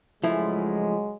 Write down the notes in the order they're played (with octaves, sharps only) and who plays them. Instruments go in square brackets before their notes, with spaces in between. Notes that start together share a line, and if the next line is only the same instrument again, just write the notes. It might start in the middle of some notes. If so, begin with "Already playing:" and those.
[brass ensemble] C#2 F#3 G#3 [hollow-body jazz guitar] F3 A3 E4